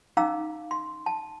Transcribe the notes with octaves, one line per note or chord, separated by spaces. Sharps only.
C#4 D#4 F5 A#5 D6 E6
C6
A5